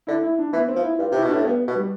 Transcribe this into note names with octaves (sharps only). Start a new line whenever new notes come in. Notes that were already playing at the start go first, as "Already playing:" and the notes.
D3 E4
E4
D4
E3 B3
C4
F3
E4
G2 F4
C3 E4
B2
A2 D4
G2 B3
B2
G3